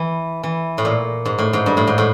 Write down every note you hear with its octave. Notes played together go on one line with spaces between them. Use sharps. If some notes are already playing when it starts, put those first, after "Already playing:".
Already playing: E3
E3
A2
A#2
G#2
A2
G#2
G2
A2
G#2
A2